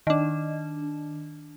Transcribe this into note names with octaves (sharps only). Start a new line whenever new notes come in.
D#3 D4